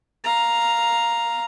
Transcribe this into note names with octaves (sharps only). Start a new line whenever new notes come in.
F5 A#5